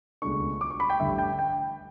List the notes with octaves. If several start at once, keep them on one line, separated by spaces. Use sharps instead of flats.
C#2 B2 A3 D4 C#6
D6
C#6
B5
G5
A1 G2 D3 A3 D4 E5
G5
G5